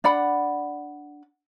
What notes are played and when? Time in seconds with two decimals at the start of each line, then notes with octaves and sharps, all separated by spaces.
0.04 D4 D5 F#5 B5